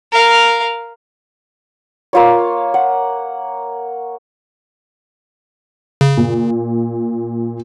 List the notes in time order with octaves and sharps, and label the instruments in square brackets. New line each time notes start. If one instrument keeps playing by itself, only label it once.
[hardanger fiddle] A#4 F5
[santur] A#3 F4 C#5
F#5
[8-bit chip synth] C#3
[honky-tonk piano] A#2